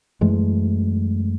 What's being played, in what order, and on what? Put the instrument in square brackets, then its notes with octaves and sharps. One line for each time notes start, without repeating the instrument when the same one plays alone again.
[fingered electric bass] F#2 E3 G#3 A3